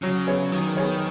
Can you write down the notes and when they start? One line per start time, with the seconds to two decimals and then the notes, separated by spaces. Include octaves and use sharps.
0.02 C#3 F#3
0.27 B3 G#4 C#5
0.52 D#3 F#3
0.77 B3 G#4 C#5